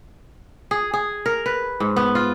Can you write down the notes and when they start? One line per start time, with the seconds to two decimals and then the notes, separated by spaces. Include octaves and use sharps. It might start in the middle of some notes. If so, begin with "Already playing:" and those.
0.71 G#4
0.93 G#4
1.26 A#4
1.46 B4
1.80 G#2
1.96 B3
2.15 F4